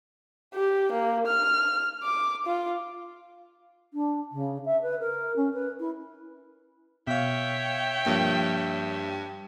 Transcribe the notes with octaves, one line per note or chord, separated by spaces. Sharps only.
G4
A#3
F6
D6
F4
D4
C#3
E5
B4
A#4
C#4
B4
E4
B2 C#5 E5 F5 G5
G2 F3 A#3